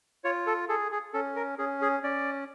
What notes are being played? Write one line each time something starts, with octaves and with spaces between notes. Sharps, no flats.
F4 C#5
A4
G#4 A4
G#4
C#4 A4
A#4
C#4 G#4
G#4
C#4 D5